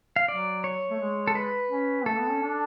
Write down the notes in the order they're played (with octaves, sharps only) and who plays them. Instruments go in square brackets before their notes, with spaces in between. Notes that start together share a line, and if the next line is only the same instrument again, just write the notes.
[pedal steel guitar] F5
[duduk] F#3 [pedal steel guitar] D5
[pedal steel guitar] C#5
[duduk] A3
G#3
[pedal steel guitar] A4
B4
[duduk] C#4
[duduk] A3 [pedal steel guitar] A4
[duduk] B3
C#4
D4